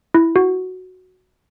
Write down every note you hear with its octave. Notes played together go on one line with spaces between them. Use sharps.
E4
F#4